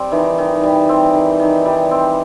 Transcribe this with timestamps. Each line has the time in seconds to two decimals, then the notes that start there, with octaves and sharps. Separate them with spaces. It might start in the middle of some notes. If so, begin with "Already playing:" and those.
Already playing: G3 C4
0.12 D#3 E3
0.38 D#3
0.63 G3
0.89 C4
1.14 D#3
1.40 D#3
1.66 G3
1.91 C4